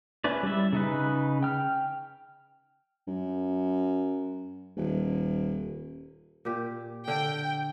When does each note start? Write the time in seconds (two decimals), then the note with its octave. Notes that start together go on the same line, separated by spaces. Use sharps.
0.24 C#4 E4 B4 D5
0.43 G3 D5 E5
0.73 C#3 D#4 B4
1.43 G5 F6
3.07 F#2
4.77 D#1
6.45 A#2 G4
7.08 D3 G5